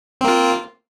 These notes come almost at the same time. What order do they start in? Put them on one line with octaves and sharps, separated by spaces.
C4 A#3 F4